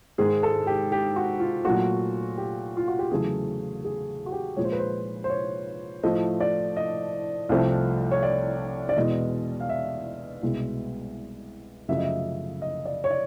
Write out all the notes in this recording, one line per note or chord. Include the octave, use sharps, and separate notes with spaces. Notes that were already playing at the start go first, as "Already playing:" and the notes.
G#2 D#3 G#3 G#4
A4
G4
G4
F#4
F4
A#2 F#3 A3 F#4
G4
F4
F#4
G4
E2 C#3 F#3 A3 G#4
G#4
F#4
G4
A#2 F3 G#3 C#5
C5
B4
C5
C5
C#5
A2 F3 A3 D#5
D5
D#5
C2 C3 F3 A3
C#5
D5
D5
E2 B2 G#3 D#5
F5
E5
C2 B2 G#3
F#2 C#3 F3 A3 E5
D#5
E5
D#5
D5
C#5
D5